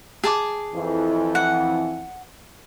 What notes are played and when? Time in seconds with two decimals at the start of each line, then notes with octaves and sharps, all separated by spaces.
0.24 G#4 A5 D6
0.74 F2 E3
1.35 F#5